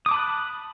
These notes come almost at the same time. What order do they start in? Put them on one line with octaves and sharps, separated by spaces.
D#6 D6 A5 B5 F#6